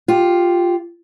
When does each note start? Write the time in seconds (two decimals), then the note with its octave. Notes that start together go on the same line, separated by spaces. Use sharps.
0.08 F4 G4